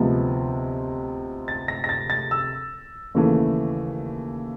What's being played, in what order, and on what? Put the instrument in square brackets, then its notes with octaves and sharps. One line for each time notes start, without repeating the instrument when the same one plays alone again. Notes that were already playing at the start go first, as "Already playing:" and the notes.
Already playing: [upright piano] D2 C3 F3 G#3 B3
A6
A#6
A#6
A6
A6
E6
D#2 C#3 E3 A3